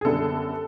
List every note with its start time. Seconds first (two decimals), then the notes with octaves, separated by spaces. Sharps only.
0.01 G#4
0.05 F#2 D3 G3 B3 D4 A4